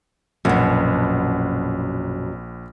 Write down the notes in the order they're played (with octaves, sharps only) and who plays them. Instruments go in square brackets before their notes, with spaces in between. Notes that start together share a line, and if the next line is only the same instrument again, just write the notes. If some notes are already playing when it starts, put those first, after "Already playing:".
[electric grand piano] A#1 F#5 [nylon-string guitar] F#2 B2